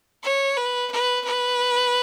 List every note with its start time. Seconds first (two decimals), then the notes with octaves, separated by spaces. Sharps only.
0.23 C#5
0.57 B4
0.91 B4
1.25 B4